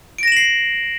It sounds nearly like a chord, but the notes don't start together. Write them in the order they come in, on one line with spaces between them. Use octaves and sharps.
D7 A#6 E7 F#7 C7